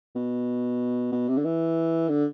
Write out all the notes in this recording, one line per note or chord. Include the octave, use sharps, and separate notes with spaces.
B2
B2
C3
D3
E3
D3